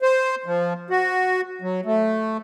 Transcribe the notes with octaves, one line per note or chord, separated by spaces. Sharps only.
C5
F3
F#4
F#3
A3